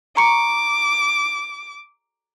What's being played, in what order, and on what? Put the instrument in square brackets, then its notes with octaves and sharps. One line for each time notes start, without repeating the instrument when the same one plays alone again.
[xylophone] A#5 C#6 C#7 [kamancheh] D6